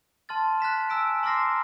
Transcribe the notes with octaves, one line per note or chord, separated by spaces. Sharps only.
A5 C6 F6 A6
F#6 A6 B6 E7
G#5 A#5 E6 B6 D7
A#5 C6 D6 F6 A#6 C7